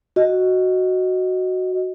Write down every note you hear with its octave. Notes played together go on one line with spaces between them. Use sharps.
F#4 D#5